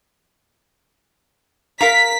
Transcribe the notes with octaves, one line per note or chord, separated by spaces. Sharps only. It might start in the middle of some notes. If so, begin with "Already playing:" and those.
A#4 F5 A#5 B6